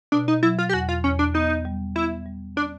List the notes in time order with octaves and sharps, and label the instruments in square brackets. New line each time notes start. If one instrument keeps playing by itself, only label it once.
[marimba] B2 [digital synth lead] D4
[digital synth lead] D#4
[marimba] F#3 [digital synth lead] E4
[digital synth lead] F4
G4
[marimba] E2 [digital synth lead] F#4
[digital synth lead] F4
[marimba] E2 [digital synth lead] C#4
[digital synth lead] D4
[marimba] B3 [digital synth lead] D#4
[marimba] G3
[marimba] B3 [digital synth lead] E4
[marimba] G3
[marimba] C#4 [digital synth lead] D4